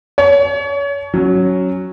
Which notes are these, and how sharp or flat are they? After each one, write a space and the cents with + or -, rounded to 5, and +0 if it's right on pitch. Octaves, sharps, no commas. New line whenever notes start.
C#5 +30 A5 -40
F#3 +0 C#4 +0